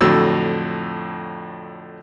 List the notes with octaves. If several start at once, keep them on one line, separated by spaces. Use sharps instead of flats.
F2 A2 D3 F#3 E6